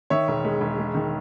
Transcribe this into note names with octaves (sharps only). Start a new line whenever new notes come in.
D#3 C#5 E5
E1
G#3
E1
G#3
D#3